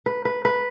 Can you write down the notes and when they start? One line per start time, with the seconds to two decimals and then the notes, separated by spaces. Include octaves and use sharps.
0.06 B4
0.25 B4
0.45 B4